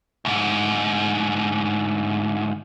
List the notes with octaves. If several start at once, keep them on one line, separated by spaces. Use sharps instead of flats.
D2 G#2